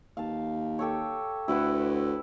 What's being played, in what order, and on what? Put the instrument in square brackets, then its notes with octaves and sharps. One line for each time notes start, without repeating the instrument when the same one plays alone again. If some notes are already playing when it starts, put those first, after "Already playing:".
[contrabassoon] D#2 [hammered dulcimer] F5 A5
[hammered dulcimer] G4 A4 C#5
[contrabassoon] D2 [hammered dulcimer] E4 B4 F#5